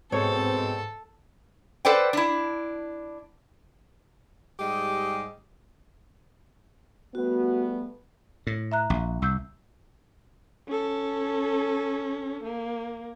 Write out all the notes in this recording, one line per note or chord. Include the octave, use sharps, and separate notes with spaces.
G#2 B2 G#3 C4 A4 C#5
A4 B4 C5 D5 F#5 G5
D4 E4
G#2 G3 G4 G#4 D#5
G3 A3 B3 F#4
A2
E5 A#5 F#6
A#1
C2 E6 G6
C#4 A4
A#3